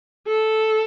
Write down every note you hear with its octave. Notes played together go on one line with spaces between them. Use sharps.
A4